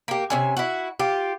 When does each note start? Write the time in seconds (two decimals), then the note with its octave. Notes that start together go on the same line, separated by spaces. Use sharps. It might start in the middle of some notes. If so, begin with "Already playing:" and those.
0.08 A#3 G4
0.30 C3 C#4 G#5
0.57 E4 F#4
1.00 F4 G4